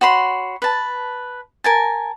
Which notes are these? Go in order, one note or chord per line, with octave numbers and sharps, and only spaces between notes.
F#4 C#5 B5 C6
B4 A5
A#4 G#5 A5